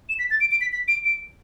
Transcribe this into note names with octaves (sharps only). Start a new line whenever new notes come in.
E7
B6
A6
D7
D7
B6
B6
D7
D7